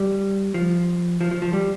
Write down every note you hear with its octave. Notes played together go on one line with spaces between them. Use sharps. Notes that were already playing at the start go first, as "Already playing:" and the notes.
Already playing: G3
F3
F3
F3
F3
G3